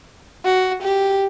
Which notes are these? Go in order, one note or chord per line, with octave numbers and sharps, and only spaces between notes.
F#4
G4